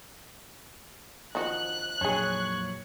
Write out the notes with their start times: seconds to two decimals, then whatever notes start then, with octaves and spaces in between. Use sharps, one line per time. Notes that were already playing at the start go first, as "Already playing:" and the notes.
1.35 D#3 F3 F#4 F#6
2.01 F2 A#2 F#3 D4 G#4 C#5